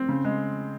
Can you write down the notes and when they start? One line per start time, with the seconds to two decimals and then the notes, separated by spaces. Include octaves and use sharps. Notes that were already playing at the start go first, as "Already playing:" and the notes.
Already playing: C4
0.09 C#3
0.24 G#3